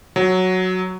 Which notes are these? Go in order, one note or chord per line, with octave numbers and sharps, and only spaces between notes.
F#3